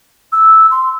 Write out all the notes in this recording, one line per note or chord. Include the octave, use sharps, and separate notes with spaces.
E6
C6